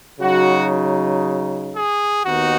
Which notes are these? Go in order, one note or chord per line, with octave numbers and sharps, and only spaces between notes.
C#3 F#3 D#4 F#4
G#4
D#2 D#3 B3 D#4 F#4